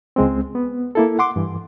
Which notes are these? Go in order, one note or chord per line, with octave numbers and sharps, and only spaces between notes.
C#2 G#3 C4
B3
A#3 E4 A4
F#5 C6 D6
G2 E3